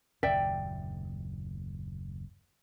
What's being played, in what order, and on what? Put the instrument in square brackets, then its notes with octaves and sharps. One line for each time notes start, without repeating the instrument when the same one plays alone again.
[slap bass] F#1 D#2 A#2 [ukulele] D5 E5 G5